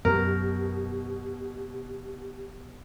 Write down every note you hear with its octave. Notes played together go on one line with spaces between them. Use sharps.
F#2 B2 F#3 G4 A#4